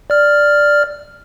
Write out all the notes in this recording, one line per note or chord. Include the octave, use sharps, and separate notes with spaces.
D5 F6